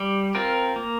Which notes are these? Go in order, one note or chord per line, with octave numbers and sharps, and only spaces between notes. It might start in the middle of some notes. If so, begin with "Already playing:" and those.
Already playing: G3
C4 F4 A#4
A#3